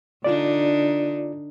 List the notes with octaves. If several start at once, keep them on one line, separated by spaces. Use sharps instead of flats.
D3 D4 D#4 F4 D5